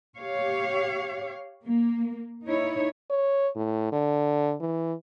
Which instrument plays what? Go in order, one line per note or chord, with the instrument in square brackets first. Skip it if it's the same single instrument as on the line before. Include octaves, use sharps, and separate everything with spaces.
[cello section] G4 C#5 F5
A#3
D#4 E4 C#5
[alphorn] C#5
A2
D3
E3